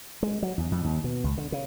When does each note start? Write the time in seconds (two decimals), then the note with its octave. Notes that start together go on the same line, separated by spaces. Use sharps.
0.23 G#3
0.43 F#3
0.58 E2
0.72 F2
0.84 D#2
1.04 B2
1.24 C#2
1.38 D3
1.52 C#3